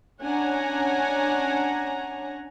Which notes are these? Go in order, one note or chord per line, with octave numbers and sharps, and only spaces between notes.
C#4 D4 C#5 F#5 G#5 A#5